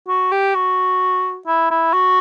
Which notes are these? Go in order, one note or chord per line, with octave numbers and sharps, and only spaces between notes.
F#4
G4
F#4
E4
E4
F#4